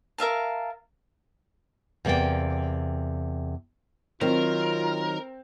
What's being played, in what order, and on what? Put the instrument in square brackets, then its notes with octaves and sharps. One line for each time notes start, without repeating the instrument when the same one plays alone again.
[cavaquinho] A#4 E5 F5 A5
[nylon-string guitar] E2 C3 A#3 D5 G5
[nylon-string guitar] D#3 F#3 [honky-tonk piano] C4 [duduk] F4 [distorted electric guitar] A#4